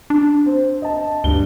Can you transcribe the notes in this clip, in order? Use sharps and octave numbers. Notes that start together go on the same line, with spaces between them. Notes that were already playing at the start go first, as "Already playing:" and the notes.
D4
C4
D#5 A5
D2 G2 G7